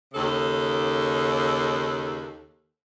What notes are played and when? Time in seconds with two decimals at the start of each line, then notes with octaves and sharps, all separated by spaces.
0.14 D#2 C#3 A4